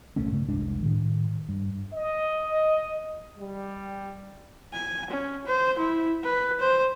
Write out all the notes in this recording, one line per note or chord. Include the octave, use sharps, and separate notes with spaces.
D#1 C2 A3 C#4
G2 C#3 A3
F1 C2 G#3 D4
A2 D#3
G2
D#5
G3
G#5
C#4
C5
E4
B4
C5